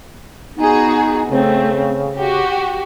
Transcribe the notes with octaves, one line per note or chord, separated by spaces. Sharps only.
B3 D#4 F#4 G#4
C#3 A3 C4
F#4 G4